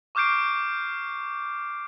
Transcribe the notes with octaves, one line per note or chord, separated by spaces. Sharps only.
C#6 D6 F6 G6 C7 D7